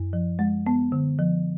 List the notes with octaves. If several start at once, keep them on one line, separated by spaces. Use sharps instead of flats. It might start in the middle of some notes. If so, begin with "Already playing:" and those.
Already playing: F#2
F3
G#3
B3
D3
F3